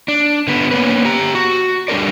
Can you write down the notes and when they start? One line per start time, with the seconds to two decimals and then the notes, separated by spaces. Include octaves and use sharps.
0.08 D4
0.48 D3 B3
0.71 A#3 B3 C#4 B4
1.05 G4 A#5
1.35 F#4
1.88 G3 D4 A4 A#4 D5